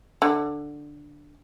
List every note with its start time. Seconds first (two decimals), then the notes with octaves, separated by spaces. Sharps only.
0.22 D3